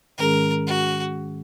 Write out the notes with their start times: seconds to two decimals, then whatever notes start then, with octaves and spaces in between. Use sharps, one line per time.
0.17 G#2 D#3 G#3 C#4 G#4 A#4
0.67 F#4